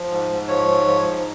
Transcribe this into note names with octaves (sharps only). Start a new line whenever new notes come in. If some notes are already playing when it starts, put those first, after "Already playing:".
Already playing: F3
G#2
G#2
F3 C#5
G#2
F3
G#2